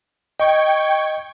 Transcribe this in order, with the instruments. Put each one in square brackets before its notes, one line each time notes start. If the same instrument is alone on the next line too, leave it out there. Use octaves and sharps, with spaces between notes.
[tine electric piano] D#5 [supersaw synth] G5 C#6 G#6